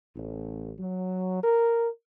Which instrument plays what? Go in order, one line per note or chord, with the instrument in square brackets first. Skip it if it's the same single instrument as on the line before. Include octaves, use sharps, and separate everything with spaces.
[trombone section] A1
F#3
A#4